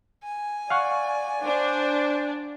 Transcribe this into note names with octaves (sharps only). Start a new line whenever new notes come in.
G#5
D5 F5 F#5 C#6
D4 C5